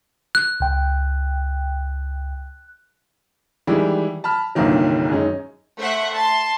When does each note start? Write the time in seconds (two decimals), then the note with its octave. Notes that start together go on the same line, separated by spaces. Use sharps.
0.35 F#6
0.60 C#2 G5
3.67 D#3 E3 G3 G#3 E4
4.24 A5 B5 F6
4.55 G1 C2 G2 A#2 D#3 F#3
5.10 F#2 G#3 C#4 D#4
5.78 A3 C5 E5 F#5
6.14 A5 C6